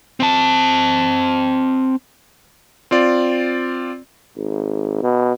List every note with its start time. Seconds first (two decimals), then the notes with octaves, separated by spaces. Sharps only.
0.20 C4 A5
2.91 C4 F4 D5
4.37 G#1
5.03 B2